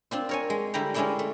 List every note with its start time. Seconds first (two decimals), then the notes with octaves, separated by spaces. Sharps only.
0.11 C4 D4 F4
0.29 A#4 C#5 G#5
0.50 G#3
0.74 D3 G3 E4 G5 A#5
0.94 G#3 C#4 D4 E4 D5 G5
1.19 A3